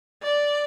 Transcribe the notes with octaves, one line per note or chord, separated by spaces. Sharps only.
D5